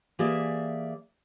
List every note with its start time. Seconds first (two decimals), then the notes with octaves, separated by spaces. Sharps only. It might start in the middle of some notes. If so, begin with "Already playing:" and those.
0.19 E3 A#3 G4 G#4 D5 E5